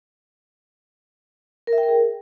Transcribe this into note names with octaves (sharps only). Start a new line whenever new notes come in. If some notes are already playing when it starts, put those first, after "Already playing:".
A#4
E5
G5
A#4
G#4